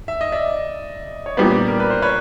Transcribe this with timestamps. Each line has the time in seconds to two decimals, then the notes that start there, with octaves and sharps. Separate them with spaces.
0.08 E5
0.21 D#5
0.32 D5 E5
1.26 C#5
1.37 A#2 G3 B3 C5 D5
1.68 A#4
1.80 B4
1.90 C5
2.02 B4 C#5